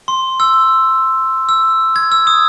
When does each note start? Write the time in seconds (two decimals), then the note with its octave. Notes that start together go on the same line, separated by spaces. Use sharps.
0.08 C6
0.40 E6
1.49 E6
1.96 G#6
2.12 E6
2.27 D#6